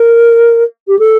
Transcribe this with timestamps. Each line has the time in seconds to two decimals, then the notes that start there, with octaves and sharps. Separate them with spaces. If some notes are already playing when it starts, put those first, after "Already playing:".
Already playing: A#4
0.88 G4
0.99 A4